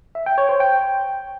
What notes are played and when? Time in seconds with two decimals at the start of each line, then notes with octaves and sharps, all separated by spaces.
0.15 E5
0.26 G5
0.38 C#5
0.49 C5
0.60 G5